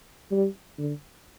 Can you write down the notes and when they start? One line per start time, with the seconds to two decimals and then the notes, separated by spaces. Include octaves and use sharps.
0.31 G3
0.78 D3